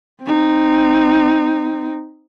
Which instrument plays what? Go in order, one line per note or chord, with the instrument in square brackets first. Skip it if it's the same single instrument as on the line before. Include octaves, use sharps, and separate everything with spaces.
[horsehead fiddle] C4 D#4